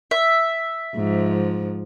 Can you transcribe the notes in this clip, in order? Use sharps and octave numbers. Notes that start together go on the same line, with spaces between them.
E5
G#2 F3